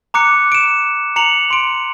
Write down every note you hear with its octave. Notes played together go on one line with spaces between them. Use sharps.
A#5 D6 F#6 C#7
D7 E7
A#5 C#7 F7 F#7
C6 D7